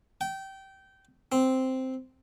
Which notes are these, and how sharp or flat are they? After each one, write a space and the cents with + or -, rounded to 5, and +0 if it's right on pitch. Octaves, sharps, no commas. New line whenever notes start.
G5 -20
C4 -5